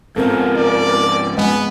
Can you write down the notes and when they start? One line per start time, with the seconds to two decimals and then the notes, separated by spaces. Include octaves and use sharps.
0.16 G#2 F3 B3 C4 A4 A#4
0.56 D5
1.37 G#3 B3 G#5